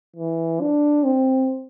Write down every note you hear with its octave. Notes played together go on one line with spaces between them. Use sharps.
E3
D4
C4